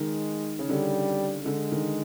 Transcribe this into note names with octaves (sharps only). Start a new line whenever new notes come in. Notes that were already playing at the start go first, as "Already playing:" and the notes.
Already playing: D#3 G#3
C#3
D3 G3
D3 G#3
D#3